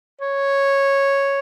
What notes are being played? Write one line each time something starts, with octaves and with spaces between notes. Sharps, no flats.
C#5